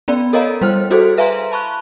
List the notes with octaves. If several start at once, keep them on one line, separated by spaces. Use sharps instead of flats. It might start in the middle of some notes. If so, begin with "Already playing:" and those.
B3 C#4 D5 B5
A4 A#4 C#5 D#5 F5 A#5
G3 C5 G5 F6
E4 F#4 G#4 A4 C5
B4 E5 F5 G#5 A#5 C6
A5 B5 C#6 F#6